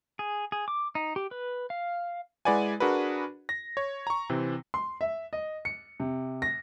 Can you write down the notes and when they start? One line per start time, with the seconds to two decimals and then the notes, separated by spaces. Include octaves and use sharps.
0.19 G#4
0.52 G#4
0.68 D6
0.95 D#4
1.16 G4
1.31 B4
1.70 F5
2.45 G#3 E4 B4 D5 F#5 G#5
2.80 D4 F#4 G#4 A#4 B4
3.49 A#6
3.77 C#5
4.07 A#5 C#6
4.30 C3 E3 C4
4.74 C6
5.01 E5
5.33 D#5
5.65 C#7
6.00 C3
6.42 A#6